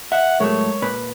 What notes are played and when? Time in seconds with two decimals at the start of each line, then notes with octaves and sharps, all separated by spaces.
0.12 E5 F#5
0.40 A2 F#3 G#3 A3 A#4 C#5
0.82 A#2 B4